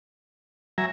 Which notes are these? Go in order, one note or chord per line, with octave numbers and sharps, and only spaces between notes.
F#3 E5 G#5 A#5